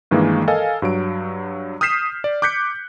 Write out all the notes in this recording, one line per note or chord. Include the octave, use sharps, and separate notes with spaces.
G2 D#3 E3 G#3 A#3
A4 A#4 D#5 F5 G#5
G2 F#3 D7
D#6 F6 G6 B6 C7 E7
D5
D6 F#6 G6 B6 C#7